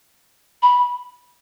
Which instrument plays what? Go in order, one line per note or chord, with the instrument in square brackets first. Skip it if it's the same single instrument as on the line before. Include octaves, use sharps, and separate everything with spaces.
[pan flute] B5